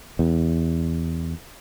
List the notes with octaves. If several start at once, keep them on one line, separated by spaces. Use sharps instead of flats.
E2